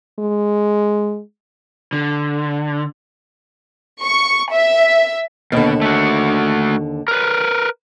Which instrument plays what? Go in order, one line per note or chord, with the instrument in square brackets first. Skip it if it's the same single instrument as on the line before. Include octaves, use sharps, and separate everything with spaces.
[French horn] G#3
[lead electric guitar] D3
[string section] C#6
E5
[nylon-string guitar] D#2 D3 [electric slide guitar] B2
[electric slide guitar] A3 F#4
A#4 B4